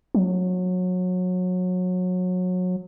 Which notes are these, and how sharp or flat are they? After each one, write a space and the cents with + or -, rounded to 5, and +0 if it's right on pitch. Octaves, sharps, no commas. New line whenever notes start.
F#3 -25